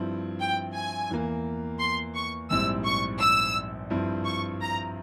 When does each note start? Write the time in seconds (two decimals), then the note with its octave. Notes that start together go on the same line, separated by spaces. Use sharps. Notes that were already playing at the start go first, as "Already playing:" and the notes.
Already playing: G2 F3 C4 E4
0.40 G5
0.74 G#5
1.10 E2 E3 A#3
1.80 C6
2.15 C#6
2.50 A#1 G#2 G3 C4 E4 E6
2.86 C#6
3.20 E6
3.90 G2 F3 C4 E4
4.25 C#6
4.61 A#5